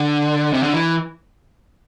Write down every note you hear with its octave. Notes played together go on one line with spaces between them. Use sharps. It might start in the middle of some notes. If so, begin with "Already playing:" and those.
Already playing: D3
C3
D3
E3